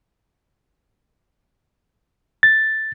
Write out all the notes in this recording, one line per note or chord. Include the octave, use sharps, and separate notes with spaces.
A6